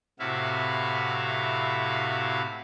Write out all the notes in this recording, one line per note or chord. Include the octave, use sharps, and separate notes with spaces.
A2 C3 E4 F#4 E5 F5